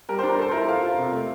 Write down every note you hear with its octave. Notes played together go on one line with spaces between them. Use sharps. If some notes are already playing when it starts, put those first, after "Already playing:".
G3 A#4
D4 C5
A#4
A4 C5
E4 A#4
A4 F5
F4
C3
A3